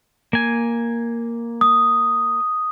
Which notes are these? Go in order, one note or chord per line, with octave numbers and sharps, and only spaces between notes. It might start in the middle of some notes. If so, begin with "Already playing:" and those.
A#3 G#5
D#6